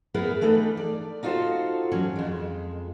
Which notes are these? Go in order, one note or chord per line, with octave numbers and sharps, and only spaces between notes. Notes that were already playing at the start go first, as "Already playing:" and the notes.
B3 E4 G#4 A#4 B4
E3 A3 D4 D#4 B4
D5
D#4 F4 F#4 A4 C5
E3 F#3 C#4
F2 G#3